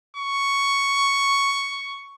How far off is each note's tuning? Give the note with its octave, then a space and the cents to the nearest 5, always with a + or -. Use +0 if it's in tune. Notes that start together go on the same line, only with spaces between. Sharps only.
C#6 +5